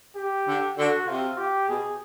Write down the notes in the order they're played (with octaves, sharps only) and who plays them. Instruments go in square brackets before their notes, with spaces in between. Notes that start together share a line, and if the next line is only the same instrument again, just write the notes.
[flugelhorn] G4
[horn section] D3
[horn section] D3 [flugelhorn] F#4
[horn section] C3 [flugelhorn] F4
[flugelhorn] G4
[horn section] B2 [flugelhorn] G#4